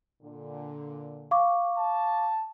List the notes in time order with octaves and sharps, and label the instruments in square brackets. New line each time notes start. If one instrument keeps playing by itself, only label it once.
[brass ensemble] A#2 D3
[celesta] F5 C#6 D6
[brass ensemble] A5